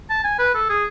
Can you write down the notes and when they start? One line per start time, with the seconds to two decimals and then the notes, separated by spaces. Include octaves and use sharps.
0.10 A5
0.24 G#5
0.39 B4
0.55 A4
0.69 G#4